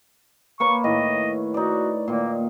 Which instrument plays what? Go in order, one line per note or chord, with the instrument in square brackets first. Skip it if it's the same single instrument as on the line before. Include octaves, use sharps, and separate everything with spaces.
[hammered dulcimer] A#3 B4 C#5 [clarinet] C#6
[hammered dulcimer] A2 D#3 [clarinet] D#5
[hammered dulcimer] D#4 D5 [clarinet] F#4
[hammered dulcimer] A#2 D#3 [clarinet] A#3